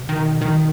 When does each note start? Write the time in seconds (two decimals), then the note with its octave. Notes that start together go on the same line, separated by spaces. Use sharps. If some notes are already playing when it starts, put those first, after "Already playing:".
Already playing: B2
0.09 D#3
0.41 B2 D#3